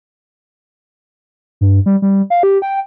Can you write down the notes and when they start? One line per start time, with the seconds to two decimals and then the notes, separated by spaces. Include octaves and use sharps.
1.61 G2
1.86 G3
2.02 G3
2.30 F5
2.43 G4
2.62 G5